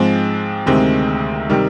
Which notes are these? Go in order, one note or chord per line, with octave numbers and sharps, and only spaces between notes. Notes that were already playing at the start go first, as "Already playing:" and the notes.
Already playing: G#2 F3 G#3 C4
D2 C3 D#3 G#3 C4
C3 D#3 G3